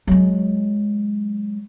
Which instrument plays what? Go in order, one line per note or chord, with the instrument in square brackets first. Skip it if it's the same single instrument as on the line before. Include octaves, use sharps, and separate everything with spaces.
[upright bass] F#3 G#3